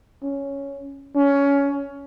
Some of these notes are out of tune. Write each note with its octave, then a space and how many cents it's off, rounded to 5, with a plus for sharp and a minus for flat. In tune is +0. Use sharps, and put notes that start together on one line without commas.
C#4 +5
C#4 +15